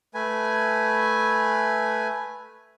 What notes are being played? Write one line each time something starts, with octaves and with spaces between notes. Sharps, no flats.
A3 B4 G#5